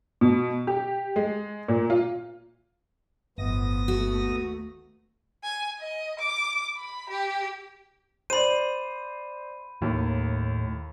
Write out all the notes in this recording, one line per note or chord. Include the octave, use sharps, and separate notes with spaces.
B2
G4
G#3
A#2
F4
G1 A2 F3 B3 D#6 A#6
D#2 A3 F#4
G#5
D#5
D6
B5
G4
C5 D5 B5 D#7
D#2 A2